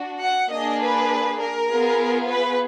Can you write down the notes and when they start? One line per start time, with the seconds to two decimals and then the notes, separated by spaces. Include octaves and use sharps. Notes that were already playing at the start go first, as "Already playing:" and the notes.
Already playing: D4 F#4
0.23 F#5
0.52 A#3 D4 G#4 D#5
0.81 B4
1.39 A#4
1.69 B3 F4 G#4
2.27 B4